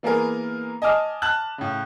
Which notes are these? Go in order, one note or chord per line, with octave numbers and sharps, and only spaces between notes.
E3 A#3 B3 G#4 A#4
D#5 G#5 A5 D6 F6
A5 F#6 F#7
A2 C#3